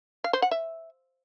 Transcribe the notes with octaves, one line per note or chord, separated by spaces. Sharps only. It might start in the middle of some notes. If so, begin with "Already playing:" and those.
F5
C5
F#5
E5